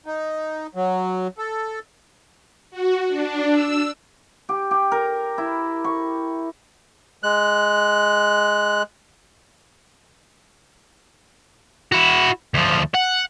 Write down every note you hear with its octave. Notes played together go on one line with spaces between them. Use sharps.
D#4
F#3
A4
F#4
D4
E6
G4
G4
A#4
E4
C#6
G#3 F#6
E4 F#4
D2 F3
F#5